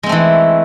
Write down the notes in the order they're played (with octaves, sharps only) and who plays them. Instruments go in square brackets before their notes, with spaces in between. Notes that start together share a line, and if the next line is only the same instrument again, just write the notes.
[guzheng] G#3
C4
A3
E3